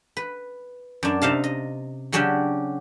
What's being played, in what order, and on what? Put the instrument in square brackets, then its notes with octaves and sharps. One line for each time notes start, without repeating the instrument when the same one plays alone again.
[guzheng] B4
F#2 D4
C3 D#4 F5 A5
D#5
C#3 F#3 C#4 D4 G4